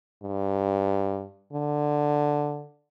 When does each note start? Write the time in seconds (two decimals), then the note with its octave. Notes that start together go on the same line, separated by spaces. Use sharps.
0.23 G2
1.53 D3